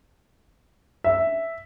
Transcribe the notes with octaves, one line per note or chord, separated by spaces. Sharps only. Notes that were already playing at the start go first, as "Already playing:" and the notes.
E5